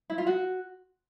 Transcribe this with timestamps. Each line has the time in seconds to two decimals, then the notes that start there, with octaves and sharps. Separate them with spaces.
0.10 E4
0.18 F4
0.27 F#4